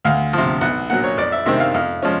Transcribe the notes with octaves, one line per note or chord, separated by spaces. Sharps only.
D2 F5
C3 F3
B1 F#5
A#2 F#3 F#5
C#5
F2 D5
E5
C3 D#3 G#3 C4 E5
F5
F2 F5
F3 G#3 C#4